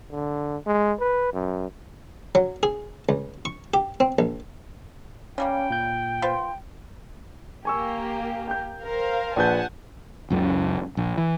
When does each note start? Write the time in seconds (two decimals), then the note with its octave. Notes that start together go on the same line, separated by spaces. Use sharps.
0.11 D3
0.66 G#3
1.00 B4
1.33 F#2
2.35 F#3
2.63 G#4
3.09 C#2
3.45 C#6
3.74 G4
4.00 C4
4.19 A#1
5.38 C#3 G3 A#3 C#4 G5
5.70 A#2 G6
6.22 F4 B4 C5
7.65 A#3 G4 G#5 C#6 E6
8.48 G5 G6
8.82 A#4 C5 F5
9.36 A#1 B4 F#5 G#5 A5 G6
10.30 C#2 F#2 C#3
10.97 A#1
11.17 E3